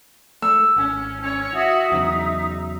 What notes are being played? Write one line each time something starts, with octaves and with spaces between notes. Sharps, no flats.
A3 E6
G#1 C#4
C#4 C#5
F#4 E5 D#6
E2 C#3 F#3 D#4